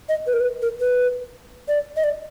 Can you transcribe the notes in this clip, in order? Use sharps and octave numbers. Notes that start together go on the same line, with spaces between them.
D#5
B4
A#4
B4
A#4
B4
D5
D#5
D5